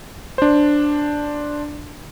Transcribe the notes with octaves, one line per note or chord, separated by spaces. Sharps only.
D4 C5